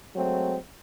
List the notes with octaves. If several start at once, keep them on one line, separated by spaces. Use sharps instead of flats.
F#3 G#3 A3 C4